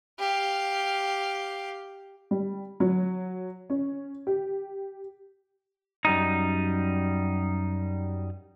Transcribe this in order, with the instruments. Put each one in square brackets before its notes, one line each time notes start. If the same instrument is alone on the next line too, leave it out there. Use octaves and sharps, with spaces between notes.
[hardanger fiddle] G4 F5
[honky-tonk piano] G3
F#3
C#4
G4
[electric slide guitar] F#2 G3 D#4